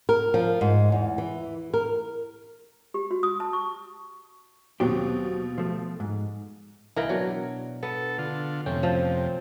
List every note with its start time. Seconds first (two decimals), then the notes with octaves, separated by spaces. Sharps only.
0.09 A#4
0.34 F3
0.61 G#2
0.92 E2
1.18 E3
1.74 A#4
2.94 G4
3.11 F#4
3.23 D#6
3.40 A5
3.53 C#6
4.80 D#2 B2 F#3 C4 G4
5.58 F3 A3
6.00 G#2
6.96 C2 E3 A#3 D#4 A#4 G5
7.09 B2 F#3 D4
7.83 B3 A4
8.18 D3 F4
8.66 F2 C3 A3 C#4 G5
8.83 F3